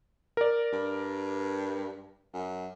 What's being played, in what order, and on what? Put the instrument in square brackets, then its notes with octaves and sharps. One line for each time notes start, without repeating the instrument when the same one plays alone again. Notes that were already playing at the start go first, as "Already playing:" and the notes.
[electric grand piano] A#4 D5
[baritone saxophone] G2
F#2